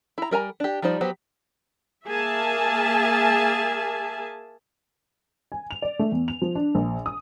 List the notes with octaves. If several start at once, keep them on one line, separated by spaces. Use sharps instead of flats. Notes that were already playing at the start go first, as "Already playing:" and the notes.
E4 A#5
G3 A#4 G#5 A#5
D4 G4
F3 G3 D#4 C5 D5
F#3 B3 G4 C5
A#3 G#4 E5 G#5 A5
G#5
F7
D5
A3
E2
F7
F3
D4
A#1
D#6